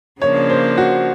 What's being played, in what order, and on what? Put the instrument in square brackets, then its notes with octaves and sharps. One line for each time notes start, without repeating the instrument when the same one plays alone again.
[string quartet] C#3 F3 A#3 D4 [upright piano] C#5
[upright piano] C5
F#4